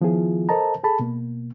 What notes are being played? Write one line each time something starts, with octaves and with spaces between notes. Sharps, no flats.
D#3 F3 B3 E4 F4 G#4
A4 A#4 C5 D#5 A5 A#5
G#4 A4 A5 B5
B2 A#3